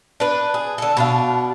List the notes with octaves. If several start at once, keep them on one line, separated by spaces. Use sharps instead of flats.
D4 B4
G#4
D3 A4
B2 D4 F5